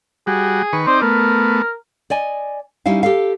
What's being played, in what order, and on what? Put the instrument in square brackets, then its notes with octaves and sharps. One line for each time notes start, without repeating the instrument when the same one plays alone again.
[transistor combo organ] G3 F#4 [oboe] G#4
[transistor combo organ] D#3 B4 C#6
[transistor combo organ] C4 D#4 D5 [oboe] C5
[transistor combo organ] A3 B3 [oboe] A#4
[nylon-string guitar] D5 D#5 G#5
G3 C#4 D#4 E4 F5
G4 A4 F5